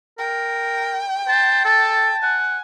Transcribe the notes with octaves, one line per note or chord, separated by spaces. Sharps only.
A#4 G5
C5 A5
A4 A5
F#5 G#5